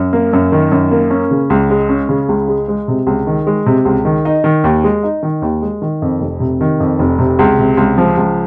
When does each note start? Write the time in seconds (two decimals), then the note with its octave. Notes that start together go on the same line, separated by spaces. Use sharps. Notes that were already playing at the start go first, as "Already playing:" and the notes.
Already playing: F#2
0.13 A#3
0.33 F#2
0.52 D#3
0.72 F#2
0.91 A#3
1.10 C#4
1.31 C#3
1.50 C#2
1.70 G#3
1.89 C#4
2.09 C#3
2.29 C#2
2.48 G#3
2.68 G#3
2.88 C3
3.07 C#2
3.27 D#3
3.47 G#3
3.66 C3
3.85 C#2
4.05 D#3
4.25 D#4
4.44 D#3
4.64 D#2
4.84 G#3
5.03 D#4
5.23 D#3
5.42 D#2
5.62 G#3
5.82 D#3
6.02 F2
6.20 F1
6.40 C3
6.61 D#3
6.80 F2
6.99 F1
7.19 C3
7.39 C#2
7.59 C3
7.77 C#2
7.98 F3
8.17 C#2